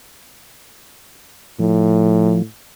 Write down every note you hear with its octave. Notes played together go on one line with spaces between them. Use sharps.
A2 F3